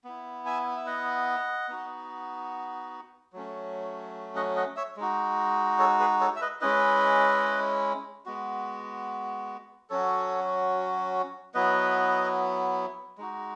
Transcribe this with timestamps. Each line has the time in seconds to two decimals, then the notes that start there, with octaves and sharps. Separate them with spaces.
0.04 B3 E4
0.46 E5 G#5
0.77 E5
0.86 D#5 F#5
1.68 B3 D#4 F#4
3.33 F#3 A3 C#4
4.36 D#5 F#5
4.56 D#5 F#5
4.76 C#5 E5
4.97 G#3 D#4 F#4
5.79 A4 C#5
6.00 G#4 B4
6.20 A4 C#5
6.36 E5
6.41 B4 D#5
6.61 G#3 C#4 E4 B4 D#5
8.26 G#3 B3 F#4
9.90 F#3 C#4 F#4 A4 C#5
11.54 F#3 B3 E4 B4 D#5
13.18 G#3 D#4 F#4